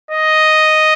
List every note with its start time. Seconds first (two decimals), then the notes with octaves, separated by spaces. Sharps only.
0.11 D#5